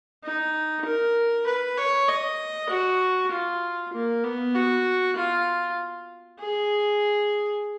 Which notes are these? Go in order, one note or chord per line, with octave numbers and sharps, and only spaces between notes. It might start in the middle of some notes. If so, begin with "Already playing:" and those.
D#4
A#4
B4
C#5
D#5
F#4
F4
A#3
B3
F#4
F4
G#4